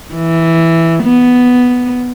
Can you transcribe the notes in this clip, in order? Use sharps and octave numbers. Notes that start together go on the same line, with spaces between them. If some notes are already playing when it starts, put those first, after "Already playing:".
E3
B3